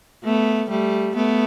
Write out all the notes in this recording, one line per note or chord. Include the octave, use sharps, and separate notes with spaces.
A3 B3
G3 A3
A3 B3